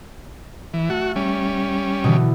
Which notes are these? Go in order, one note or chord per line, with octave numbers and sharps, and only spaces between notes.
E3
A3 F#4
G3 C#4
B2 D3 E3